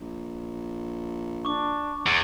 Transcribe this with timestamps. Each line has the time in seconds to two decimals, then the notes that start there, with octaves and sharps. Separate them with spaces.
0.01 A#1
1.45 D4 C#6 D6
2.07 E2